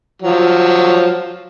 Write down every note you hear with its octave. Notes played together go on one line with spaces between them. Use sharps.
F3 F#3